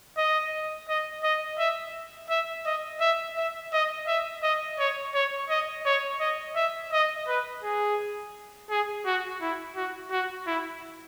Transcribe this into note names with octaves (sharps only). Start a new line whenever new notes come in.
D#5
D#5
D#5
E5
E5
D#5
E5
E5
D#5
E5
D#5
C#5
C#5
D#5
C#5
D#5
E5
D#5
B4
G#4
G#4
F#4
E4
F#4
F#4
E4